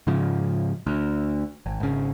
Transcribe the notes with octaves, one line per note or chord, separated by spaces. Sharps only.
G#2 C#3 F3
D2
G#1
G#1 C#3